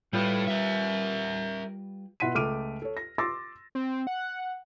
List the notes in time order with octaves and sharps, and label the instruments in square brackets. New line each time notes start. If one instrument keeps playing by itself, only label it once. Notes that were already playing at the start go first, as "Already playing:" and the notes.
[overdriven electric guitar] A2 A3 [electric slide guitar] G3 F4 B4
[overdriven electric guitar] A#4 E5
[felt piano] B2 E4 F#5 C6 B6 D#7
C#2 A3 D6 F6 D7 D#7
A4 C#5
A#6
C6 D6 E6 A6 A#6
[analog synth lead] C4
F#5